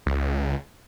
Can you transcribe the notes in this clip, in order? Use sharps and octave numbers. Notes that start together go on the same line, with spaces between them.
C#2